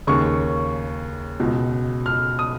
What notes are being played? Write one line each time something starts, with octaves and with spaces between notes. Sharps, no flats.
D#2 C#3 C#6
C#2 B2
F6
D#6